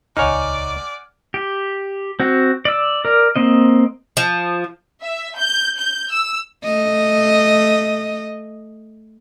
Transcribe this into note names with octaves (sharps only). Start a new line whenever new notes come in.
D#1 C#2 D#4 C#5 D5 F#5 G#5 F6
G4
C4 F#4
D5 E6
A#4 D5
A#3 C4 D#5
F3
E5
G6
G6
E6
A3 D#5